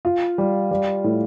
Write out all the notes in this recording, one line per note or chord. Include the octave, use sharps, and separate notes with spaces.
F4
G3
G3
A2